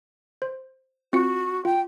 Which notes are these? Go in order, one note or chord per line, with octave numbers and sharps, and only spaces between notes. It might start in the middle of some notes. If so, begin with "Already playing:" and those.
C5
C4 F4 F#4 C#7
F4 G5